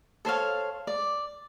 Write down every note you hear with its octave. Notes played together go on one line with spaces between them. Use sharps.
A4 C5 C#5 F5
D5